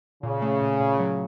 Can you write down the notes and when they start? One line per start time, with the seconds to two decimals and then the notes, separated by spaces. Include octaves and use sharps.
0.23 A#2 C#3
0.42 A3
0.61 A#2
0.80 A#2
0.99 F#3